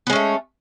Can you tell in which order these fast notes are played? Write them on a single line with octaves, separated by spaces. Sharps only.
B3 G#3 C#4 A3